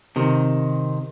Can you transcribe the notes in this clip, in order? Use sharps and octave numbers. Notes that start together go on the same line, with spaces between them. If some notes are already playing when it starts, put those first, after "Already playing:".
C3 D#3